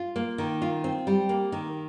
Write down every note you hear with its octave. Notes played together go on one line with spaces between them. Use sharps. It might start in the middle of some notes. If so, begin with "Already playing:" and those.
Already playing: F4
A#3
D#3
F4
C4
G3
A#3
D#3